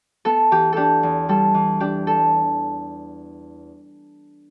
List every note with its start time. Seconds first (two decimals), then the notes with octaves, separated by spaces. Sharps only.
0.25 B3 A4
0.51 E3 G4
0.73 D4 G4 A4
1.03 E2
1.29 G3 A4
1.54 E3
1.80 D4 G4
2.07 A4